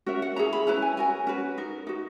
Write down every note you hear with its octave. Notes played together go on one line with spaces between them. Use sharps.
C#4 F#4 A#4 E5
F#5
C#4 E4 G#4 A#5
B5
C#4 E4 B4 A#5
G#5
C#4 F#4 A#4 G#5
C#4 F#4 B4
D#4 A#4
D#4 F#4